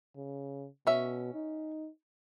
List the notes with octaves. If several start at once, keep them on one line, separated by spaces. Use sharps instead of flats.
C#3
B2 C#4 E5
D#4